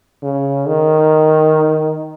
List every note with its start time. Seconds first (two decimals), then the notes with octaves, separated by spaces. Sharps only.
0.23 C#3
0.68 D#3